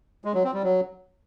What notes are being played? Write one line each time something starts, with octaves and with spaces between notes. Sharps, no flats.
G#3
F#3
C4
G3
F#3